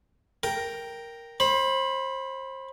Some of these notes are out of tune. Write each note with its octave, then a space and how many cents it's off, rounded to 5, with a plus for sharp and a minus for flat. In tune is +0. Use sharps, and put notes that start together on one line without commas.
A#4 +0 G5 +0
C5 +30 B5 +0